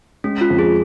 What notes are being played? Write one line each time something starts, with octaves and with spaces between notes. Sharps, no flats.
G#3 C#4
F4
F2
G#4